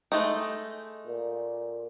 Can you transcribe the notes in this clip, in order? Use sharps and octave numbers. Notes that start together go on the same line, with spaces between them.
G#3 A3 D#4
A#2